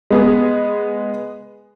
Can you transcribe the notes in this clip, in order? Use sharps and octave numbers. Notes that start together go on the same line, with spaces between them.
G#3 B3 G#4